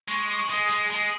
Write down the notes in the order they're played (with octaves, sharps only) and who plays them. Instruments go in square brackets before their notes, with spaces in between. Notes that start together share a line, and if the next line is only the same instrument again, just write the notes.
[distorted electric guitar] G#3 [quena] C#6
[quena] D#6
C#6
[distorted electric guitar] G#3 [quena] D#6
[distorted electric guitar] G#3
G#3